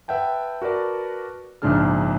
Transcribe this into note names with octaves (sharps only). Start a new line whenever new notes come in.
B4 E5 F#5 G5 A5
F#4 A#4 B4 D5 A5
A#1 G#2 C#3 D4 G#4 F6